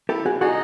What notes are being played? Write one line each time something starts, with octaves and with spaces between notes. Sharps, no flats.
E4 G4 A4
F#4 G#4
D#4 F#4 G#4